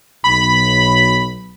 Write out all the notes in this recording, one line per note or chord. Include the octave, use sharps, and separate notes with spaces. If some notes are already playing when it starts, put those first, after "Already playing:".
B1 B5